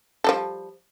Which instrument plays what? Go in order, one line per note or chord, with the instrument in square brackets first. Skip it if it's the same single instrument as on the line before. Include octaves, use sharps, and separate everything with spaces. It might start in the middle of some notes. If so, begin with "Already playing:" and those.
[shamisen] F3 G3 A4